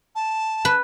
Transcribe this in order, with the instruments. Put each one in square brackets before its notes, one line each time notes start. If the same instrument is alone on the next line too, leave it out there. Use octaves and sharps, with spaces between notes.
[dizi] A5
[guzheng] B4